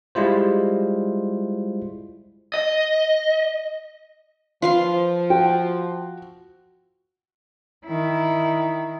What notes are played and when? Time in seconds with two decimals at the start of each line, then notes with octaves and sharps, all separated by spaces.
0.15 G3 G#3 E4 F4 C5
2.54 D#5
4.62 F3 F4 B4 F5 C6
5.30 F#4 G5
7.86 D#3 E4